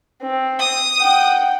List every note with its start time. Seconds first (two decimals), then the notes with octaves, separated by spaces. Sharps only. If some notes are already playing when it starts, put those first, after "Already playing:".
0.23 C4
0.59 D#6
1.01 F#5 G5